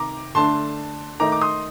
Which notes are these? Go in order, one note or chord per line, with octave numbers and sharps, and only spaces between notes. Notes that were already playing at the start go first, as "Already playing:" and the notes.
Already playing: C3 D#3 A#5 D6
D3 A3 D4 A5 C6
D#3 A3 D#4 A#5 D6
D6
C6 D#6